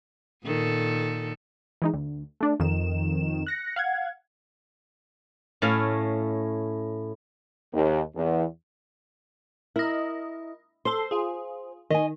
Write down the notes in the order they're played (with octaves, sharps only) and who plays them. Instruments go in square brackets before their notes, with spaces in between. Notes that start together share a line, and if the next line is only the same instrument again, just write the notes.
[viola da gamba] A#2 D#3 A4
[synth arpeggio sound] E3 G#3 D#4
D2
A3 D4
F2 D#3 E7
F#6 A#6 C#7
F5 F#5 G#6
[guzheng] A2 A3 C#4 F5
[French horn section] D#2
E2
[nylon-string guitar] E4 [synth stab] A#4 D#5
[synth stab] A4 C6 [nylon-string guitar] C5
[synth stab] F4 G#4
[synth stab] D#3 [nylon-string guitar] D#5 G#5